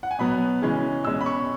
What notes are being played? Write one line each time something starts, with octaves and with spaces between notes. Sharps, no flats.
F#5
G#5
B2 F#3 B3 B5
C#3 E3 G#3 C#4
B2 G#3 C#4 E6
B5
C#6